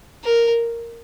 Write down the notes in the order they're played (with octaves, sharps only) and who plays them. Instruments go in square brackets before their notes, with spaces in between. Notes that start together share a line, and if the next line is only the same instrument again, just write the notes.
[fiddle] A#4